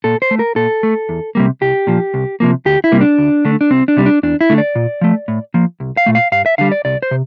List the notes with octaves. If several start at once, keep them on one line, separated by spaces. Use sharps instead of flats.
A#2 A4
C5
A3
A#4
A#2 A4
A3
E2
C3 G3 A#3
C2 G4
A#2 F3
C2
C3 F3 A#3
D2 G4
E4
C3 G3 A#3
D4
D2
D3 A3
D4
C2 C4
D4
C3 G3
D4
E2 D4
E4
D3 A3
D5
A#2
F3 A3
A2
F3 A#3
C2
F5
A#2 A3
F5
G2 F5
E5
D3 G3 F5
D5
C2 D5
C5
C3